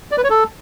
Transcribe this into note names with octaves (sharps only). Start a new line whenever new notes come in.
D5
B4
C#5
A4